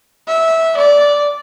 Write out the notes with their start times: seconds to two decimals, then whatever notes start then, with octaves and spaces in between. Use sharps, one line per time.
0.28 E5
0.78 D5